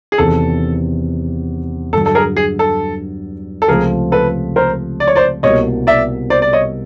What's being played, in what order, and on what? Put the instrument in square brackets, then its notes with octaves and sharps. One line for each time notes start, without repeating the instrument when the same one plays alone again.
[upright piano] G#4
[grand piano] E2 C3 D#3 [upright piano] A4
[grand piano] G2 D3 F#3 [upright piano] A4
[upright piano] A4
G#4 A#4
G#4
A4
A4
[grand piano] C#2 C3 F3 A3 [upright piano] G#4 A#4
[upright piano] A4 B4
A#4 C5
D5
C#5
C5 D5
[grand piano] C2 B2 G3 A#3 [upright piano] C#5 D#5
[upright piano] D5 E5
C5 D5
D5
C#5 D#5